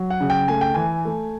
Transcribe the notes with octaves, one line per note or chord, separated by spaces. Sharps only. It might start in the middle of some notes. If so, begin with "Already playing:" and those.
Already playing: F#3
F#5
C#3
G5
A3 G#5
G5
E3 G#5
A3